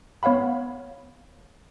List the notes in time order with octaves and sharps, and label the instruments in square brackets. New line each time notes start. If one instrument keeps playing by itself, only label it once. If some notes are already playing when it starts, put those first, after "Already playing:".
[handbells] B3 C#5 F5 F#5 B5